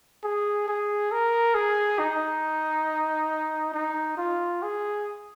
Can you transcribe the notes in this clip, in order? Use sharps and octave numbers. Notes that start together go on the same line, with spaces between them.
G#4
G#4
A#4
G#4
D#4
D#4
F4
G#4